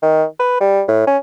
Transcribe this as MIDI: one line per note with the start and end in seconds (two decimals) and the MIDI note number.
0.02 0.25 51
0.40 0.58 71
0.61 0.82 55
0.88 1.06 45
1.07 1.17 61